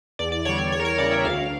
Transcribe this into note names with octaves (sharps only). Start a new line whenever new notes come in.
E2 D5
D5
D3 G3 C#5
C#5
E2 C#5
A#4
C#5
C#3 E3 G3 D5
E5
D2 F5